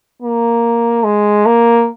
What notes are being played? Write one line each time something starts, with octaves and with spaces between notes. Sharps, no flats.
A#3
G#3
A#3